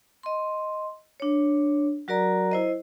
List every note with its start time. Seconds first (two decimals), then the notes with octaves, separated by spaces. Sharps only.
0.23 D#5 C6
1.20 D4 C#5
2.08 F#3 F#4 A#4 D5 A#5
2.52 E4 C5 D#5